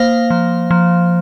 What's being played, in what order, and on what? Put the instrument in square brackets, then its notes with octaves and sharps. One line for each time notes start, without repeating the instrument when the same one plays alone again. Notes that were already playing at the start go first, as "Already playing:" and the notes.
Already playing: [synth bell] A#3 C5 F5
F3
F3